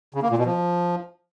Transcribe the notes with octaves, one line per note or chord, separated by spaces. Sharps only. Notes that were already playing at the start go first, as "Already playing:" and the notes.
C#3
A#3
A#2
B2
F3